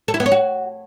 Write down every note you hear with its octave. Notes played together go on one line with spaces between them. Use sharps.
A4
E4
B3
C#5
F#4